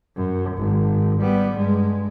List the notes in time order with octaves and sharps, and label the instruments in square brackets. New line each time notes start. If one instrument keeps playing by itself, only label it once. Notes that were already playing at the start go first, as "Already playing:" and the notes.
[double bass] F#2
G#1
G3 B3
G2 G#3